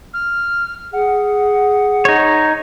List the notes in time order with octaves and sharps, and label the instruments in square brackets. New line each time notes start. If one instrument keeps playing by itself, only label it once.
[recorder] F6
[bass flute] G#4 [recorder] F#5
[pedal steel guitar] D#4 C#5